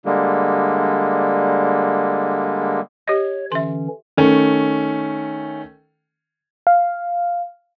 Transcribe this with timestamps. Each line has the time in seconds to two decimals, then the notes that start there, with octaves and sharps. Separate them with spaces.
0.05 D3 G3 G#3 A#3
3.08 G4 C#5 D#5
3.52 D3 E3 C#4 E5 C6
4.17 D#3 A3 C#4
6.67 F5